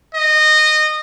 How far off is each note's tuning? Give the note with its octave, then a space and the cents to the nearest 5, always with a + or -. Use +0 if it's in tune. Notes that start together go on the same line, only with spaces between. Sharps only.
D#5 -20